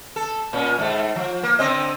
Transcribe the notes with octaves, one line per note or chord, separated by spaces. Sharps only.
A4
A#2 C#4
G#2 A3
F3
A#3
D3 C4 D#5